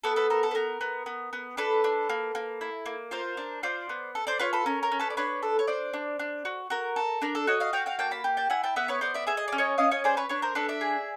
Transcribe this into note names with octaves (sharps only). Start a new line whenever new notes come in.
B3 A4 B4
A4 B4
A4 A#4
A4
B4
B3 A#4
B3
B3
B3
D4 A4 B4
D4
A#3
A#3
E4
A#3
F4 A#4 C5
D4
F4 C5 D5
B3
A4
C5 D5
F4 B4 C#5
A4 B4
C#4 A#4
A#4
C#4
A4 B4
D5
D4 B4 C#5
A4
C#5
D4 C5 D5
D4
D4
F#4
F#4 A#4
A4
D4 A#4
A4
F#4 C#5 D#5
D#5 F5
F#4 F5 G5
F5 G5
A#3 G5 A5
A5 B5
G4
G5 A5
E4 F#5 G#5
G5 A5
B3 E5 F#5
B4 C#5
B3 C5 D5
D5 E5
G#4 E5
D#5
C#4 D5
C#5 D#5
C#4 D#5 F5
C#5 D#5
G#4 C5 D5
B4 C#5
D4 B4 C#5
A#4 C5
D4 A4 B4
D5 E5
G#4